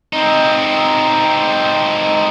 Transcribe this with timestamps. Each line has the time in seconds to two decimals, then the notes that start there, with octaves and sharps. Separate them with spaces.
0.13 C4 D#4